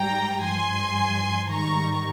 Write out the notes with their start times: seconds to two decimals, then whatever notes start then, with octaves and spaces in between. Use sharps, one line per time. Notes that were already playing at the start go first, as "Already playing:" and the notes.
Already playing: G#2 G3 G5 A#5
0.44 G2 F3 G#5 C6
1.51 G#2 D#3 G3 A#5 C#6